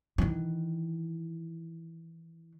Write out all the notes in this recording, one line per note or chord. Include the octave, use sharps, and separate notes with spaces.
D#3 E3